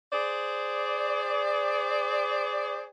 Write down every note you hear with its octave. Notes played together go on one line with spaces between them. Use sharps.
G#4 C5 D5